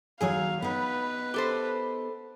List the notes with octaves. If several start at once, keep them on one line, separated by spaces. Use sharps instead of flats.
D#2 F#3 G#4 C#5 F5
B3 D#4 B4
G4 A4 C5